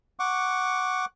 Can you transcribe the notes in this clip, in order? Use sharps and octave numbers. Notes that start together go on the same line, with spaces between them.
F#5 C#6 D6